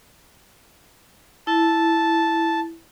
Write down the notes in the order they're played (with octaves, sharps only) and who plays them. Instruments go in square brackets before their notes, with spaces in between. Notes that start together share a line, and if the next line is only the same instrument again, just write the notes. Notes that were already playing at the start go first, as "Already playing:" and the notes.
[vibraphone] E4 [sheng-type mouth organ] A5